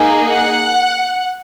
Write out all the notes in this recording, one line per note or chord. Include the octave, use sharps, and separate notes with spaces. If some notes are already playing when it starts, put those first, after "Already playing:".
Already playing: A#3 D#4 G#4
F#5